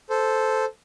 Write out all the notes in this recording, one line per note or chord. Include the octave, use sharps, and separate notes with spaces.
A4 C5